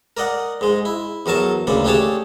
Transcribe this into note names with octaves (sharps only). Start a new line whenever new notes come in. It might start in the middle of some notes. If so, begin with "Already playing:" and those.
A#4 D5 D#5 F#5
G#2 G#3
E4
E2 F#3 A#4 A5 C#6
A1 D2 C#3 A#3 D5
A3 D4 G4 G#4 C#5 A5